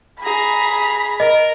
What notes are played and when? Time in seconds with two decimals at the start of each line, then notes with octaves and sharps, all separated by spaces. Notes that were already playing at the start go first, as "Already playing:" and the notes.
0.23 G#4 A#5 B5
1.20 A#4 D#5